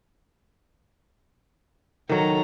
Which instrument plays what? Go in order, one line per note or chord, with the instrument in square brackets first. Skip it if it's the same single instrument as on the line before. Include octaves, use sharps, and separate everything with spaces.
[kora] D#3 F#3 [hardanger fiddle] A4 A#5